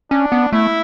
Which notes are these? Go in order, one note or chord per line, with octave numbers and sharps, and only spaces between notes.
C#4 D4
B3
A3 E4